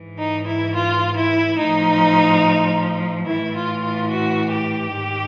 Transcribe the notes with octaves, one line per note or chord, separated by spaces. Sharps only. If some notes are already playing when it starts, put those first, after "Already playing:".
Already playing: G#2 E3
D#4
E4
F4
E4
A2 F3 D#4
A2 E3 E4
F4
F4
F#4
G4
G#2 D#3